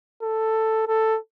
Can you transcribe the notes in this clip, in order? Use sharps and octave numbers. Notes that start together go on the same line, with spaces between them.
A4
A4